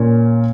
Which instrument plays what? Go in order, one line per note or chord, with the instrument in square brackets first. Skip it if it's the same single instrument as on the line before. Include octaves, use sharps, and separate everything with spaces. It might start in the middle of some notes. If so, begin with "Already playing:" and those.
Already playing: [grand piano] A#2 A#3 C#4